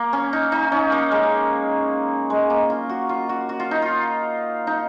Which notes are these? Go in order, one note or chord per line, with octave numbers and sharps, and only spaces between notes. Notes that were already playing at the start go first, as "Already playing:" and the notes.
Already playing: A#3
C#4
D#4
D#4
C#4
A#3
G#3
G#3
A#3
F4
F#4
F4
F#4
F#4
F4
D#4
F4
D#4